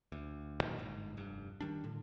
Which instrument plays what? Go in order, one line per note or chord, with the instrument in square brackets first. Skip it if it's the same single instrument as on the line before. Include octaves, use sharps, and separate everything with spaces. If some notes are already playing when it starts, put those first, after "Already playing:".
[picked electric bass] D2
A#2 D#3 F#3
G1 G#2
F1 G2
D#3 G3 D4
A2 D3